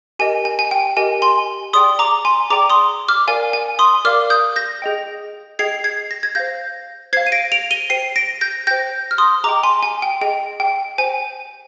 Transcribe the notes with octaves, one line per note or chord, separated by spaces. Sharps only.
G4 A#4 D#5 G#5
G#5
G#5
G5
G4 A#4 D#5 G#5
G#5 C6
G#4 D5 G5 C6 D#6
A#5 D6
G#5 C6
G#4 D5 G5 A#5 D6
C6 D#6
D6 F6
A#4 D5 F5 G#5
G#5
C6 D#6
A#4 D5 F5 D6 F6
D#6 G6
G6 A#6
G#4 D#5 G5
G#4 D#5 G5 G#6 C7
G#6 C7
A#6
G#6
C5 F5 G6 A#6
C5 F5 G#6 C7
D#7
A#6 D7
D7 F7
D#7 G7
C5 G5 C7 D#7
A#6 D7
G6 A#6
C5 G5 G6 A#6
F6
C6 D#6
G#4 D#5 G5 A#5 D6
G#5 C6
G#5
G5
G#4 D#5 G5
G5
C5 G5 G#5